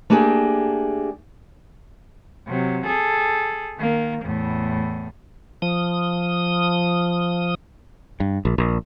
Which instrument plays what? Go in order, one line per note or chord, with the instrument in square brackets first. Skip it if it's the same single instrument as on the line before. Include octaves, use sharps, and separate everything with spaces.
[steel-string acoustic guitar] A3 A#3 D4 G4 G#4
[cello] C3 F#3
G#4 A4
D#3 A#3
E2 A2
[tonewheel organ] F3 D#6
[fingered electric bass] G2
A#1
A#1